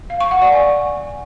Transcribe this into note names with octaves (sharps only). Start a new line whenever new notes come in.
F5
C#6
F#5
D5
G#5